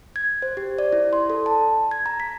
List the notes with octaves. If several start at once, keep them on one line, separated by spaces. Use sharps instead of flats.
G#6
C5
G4
D5
E4
C6
A4
A5
G#6
A#5
B6